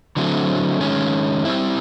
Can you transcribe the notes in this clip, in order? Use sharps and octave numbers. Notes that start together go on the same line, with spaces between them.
D3 F#3 A3 C4
D#3 G#3 C#4
G3 C4 E4